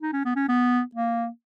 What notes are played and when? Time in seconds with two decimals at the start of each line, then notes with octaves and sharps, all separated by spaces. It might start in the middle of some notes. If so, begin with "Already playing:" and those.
0.02 D#4
0.13 C#4
0.25 B3
0.36 C#4
0.48 B3
0.95 A#3